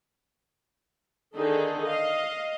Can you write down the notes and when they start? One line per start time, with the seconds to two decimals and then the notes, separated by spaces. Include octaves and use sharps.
1.36 D3 D#3 D#4 G#4 A4
1.86 D#5 F5